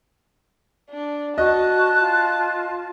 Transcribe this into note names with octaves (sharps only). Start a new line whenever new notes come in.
D4
F#4 D#5 A5 F#6
F4